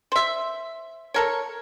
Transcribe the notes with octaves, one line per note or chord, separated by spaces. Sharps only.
C5 E5
A4 A#4 C#5